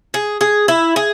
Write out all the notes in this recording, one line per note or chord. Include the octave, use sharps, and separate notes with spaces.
G#4
G#4
E4
G#4